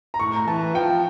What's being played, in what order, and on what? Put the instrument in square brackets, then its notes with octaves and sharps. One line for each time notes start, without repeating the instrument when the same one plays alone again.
[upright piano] A#5
[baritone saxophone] A2 [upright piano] C#6
[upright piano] A#5
[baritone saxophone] E3 [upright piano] A5
[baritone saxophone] F3 [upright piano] G5